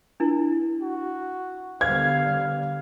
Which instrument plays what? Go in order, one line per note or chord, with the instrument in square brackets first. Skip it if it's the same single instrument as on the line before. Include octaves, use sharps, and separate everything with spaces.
[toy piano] D4 E4
[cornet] F#4
[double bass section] D3 G3 B3 [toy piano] C5 [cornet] F5 [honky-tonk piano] G#6